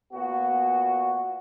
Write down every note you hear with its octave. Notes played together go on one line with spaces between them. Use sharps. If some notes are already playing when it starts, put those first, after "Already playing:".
A#2 B3 F#4